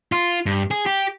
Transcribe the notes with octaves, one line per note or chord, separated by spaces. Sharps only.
F4
G2
G#4
G4